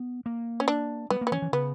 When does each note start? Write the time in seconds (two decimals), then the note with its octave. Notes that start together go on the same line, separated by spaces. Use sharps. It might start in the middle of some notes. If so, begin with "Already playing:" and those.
Already playing: B3
0.26 A#3
0.60 C#4
0.68 D4
1.10 G3 B3
1.21 A#3
1.27 B3
1.32 E3 C#4
1.42 E3
1.53 C#3 B3